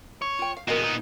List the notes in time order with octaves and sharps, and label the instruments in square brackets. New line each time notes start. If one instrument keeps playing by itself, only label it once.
[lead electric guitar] C#5
[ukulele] F4 G5
F5
[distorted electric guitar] A#2 B3 [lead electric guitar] F#4 G#4 [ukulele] A#4 D#5
[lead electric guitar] D#4